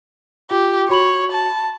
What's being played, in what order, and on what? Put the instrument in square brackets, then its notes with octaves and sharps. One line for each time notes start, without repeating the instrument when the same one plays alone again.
[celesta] F4 [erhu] G4
[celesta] F#4 B5 F#7 [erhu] C#5
[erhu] A5